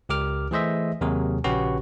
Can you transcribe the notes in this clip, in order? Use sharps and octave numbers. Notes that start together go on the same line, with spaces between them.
C#2 G4 A#4 D6 F6
E3 A3 G#4 C5 D#5 E5
D#2 C3 F#3 F#4 G#4 A#4
A#1 C#3 C#4 F#4 G4 B4